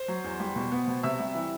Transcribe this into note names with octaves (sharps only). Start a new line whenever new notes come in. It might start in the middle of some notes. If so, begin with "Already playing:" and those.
Already playing: C5
F#3
E2
G3
B2
B3
B2
C3 E5 E6
G3
E3